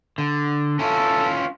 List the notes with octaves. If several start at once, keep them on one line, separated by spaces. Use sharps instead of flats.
D3
C#4 E4 F4 A4